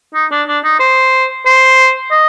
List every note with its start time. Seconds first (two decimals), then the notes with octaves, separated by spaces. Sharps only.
0.14 D#4
0.31 D4
0.48 D4
0.64 D#4
0.79 C5
1.46 C5
2.11 D#5